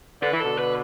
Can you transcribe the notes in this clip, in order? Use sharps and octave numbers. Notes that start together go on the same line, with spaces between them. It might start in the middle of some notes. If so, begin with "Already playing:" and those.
D3 B4
E3
B2 D3 A4
B4